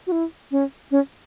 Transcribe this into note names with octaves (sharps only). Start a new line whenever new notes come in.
F#4
E4
C#4
C#4